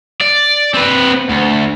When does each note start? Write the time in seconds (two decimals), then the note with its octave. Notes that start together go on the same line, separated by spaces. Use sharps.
0.21 D5
0.74 C4 B4
1.29 D2